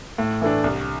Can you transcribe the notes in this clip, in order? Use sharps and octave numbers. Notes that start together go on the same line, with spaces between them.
A2
E3 A3 D4
C2